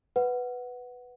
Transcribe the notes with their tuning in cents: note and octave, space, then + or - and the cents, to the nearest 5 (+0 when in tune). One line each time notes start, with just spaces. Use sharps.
B4 +5 F#5 +0